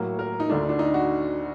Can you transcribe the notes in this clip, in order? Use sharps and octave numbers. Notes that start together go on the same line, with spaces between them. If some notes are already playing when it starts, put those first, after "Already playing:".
Already playing: A2 F#3 A#3
A#4
D#4
D2 D3 A3 D4
D4
D#4
F#4